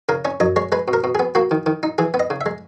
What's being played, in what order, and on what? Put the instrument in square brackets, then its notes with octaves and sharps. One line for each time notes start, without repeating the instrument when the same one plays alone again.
[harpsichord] C#3 A#4
C#4 C#5
F#2 D#5
G#3 C#5
G#3 B4
B2
A#4
B2
G#4
B3
A#3 F#4
D#3
D#3
D#4
E3 G#4
B3
D#5
C#3
E5
G#3